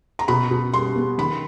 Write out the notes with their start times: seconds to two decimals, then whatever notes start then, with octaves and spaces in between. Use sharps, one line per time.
0.19 A#5
0.28 B2 B5
0.51 B2
0.74 G3 C6
0.96 B3
1.18 D#3 B5